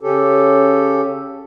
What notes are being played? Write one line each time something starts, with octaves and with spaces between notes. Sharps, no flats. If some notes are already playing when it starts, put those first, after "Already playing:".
C#3 C#4 G4 A4